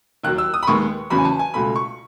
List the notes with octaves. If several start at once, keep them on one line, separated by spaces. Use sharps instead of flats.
D#2 D#3 F#3 F#6
E6
D#6
B5
D#2 D#3 G#3 B3 C#6
E2 C#3 F#3 B3 B5
G#5
A5
G#5
C#2 B2 A3 B5
C#6